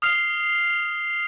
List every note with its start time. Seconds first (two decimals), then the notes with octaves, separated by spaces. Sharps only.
0.02 D#6 F6 C7 F7